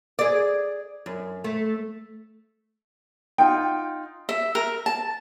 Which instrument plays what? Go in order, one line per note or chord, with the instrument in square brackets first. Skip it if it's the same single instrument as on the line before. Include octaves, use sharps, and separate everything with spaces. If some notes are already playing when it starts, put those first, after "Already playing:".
[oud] G#4 D5
F#2
A3
[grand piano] D#4 F4 F#5 [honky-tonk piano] G5
[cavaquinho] E5
A#4
A5